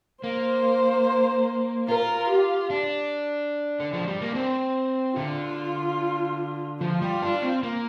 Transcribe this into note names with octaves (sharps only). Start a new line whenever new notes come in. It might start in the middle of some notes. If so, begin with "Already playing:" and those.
A#3 C5
F4 A#4
G4
D4
D3
F3
G3
A#3
C4
D3 F4
F3 F4
G3
D4
C4
A#3